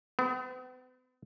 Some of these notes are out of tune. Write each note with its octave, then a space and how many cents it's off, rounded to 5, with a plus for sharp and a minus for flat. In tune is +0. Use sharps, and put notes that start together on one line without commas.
B3 +45